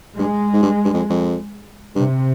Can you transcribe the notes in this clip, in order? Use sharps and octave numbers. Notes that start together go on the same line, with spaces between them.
G2 G#3
G#2
G2
G2
F2
F2
G2 C3